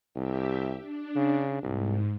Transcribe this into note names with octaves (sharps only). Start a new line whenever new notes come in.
C2 G4 E5
D4
C#3
C2 G#2